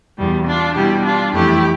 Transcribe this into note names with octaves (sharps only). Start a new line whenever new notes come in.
E2 B2 G3
D4 F4
B2 G3 E4 G4
D4 F4
F2 E3 A3 E4 G4